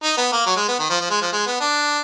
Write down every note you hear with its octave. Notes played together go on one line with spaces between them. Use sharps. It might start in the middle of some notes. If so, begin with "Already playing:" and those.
D#4
B3
A#3
F#3
G#3
B3
D#3
F3
F3
G#3
F3
G#3
B3
D4